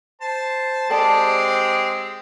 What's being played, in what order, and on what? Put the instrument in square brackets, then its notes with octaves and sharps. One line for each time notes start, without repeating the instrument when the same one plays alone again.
[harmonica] C5 A5
[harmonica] G#3 C4 G4 [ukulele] A4 D5 A5